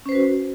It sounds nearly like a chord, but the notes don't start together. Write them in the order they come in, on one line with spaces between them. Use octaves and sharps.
C#4 C5 B4 F#4